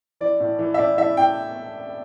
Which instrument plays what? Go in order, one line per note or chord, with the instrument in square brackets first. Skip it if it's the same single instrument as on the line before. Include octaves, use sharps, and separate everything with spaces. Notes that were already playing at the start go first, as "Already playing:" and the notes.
[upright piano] E3 D5
A2
E3
E5
A2 D5
E3 E5
A2 G5